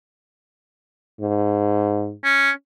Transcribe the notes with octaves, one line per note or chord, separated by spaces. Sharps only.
G#2
C#4